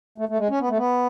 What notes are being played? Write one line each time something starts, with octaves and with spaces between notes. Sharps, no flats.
A3
A3
G#3
C#4
B3
A3
B3